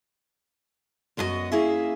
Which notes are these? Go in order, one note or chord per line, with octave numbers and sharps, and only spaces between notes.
F#2 A3 B3 F4 F#4 D#5
A#3 C#4 E4 G#4 E5